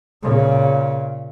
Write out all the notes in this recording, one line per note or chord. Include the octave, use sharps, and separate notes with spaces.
A#2 C#3